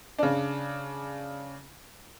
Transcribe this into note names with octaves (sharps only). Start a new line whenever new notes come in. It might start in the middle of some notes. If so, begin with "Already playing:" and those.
C#3 D4